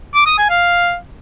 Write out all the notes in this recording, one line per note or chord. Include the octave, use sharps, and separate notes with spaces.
D6
D#6
G#5
F5